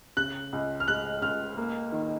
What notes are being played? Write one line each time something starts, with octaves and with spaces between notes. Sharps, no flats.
C#3 F#6
C#2
F6
G#3 F#6
C#2 F6
A#3
D#3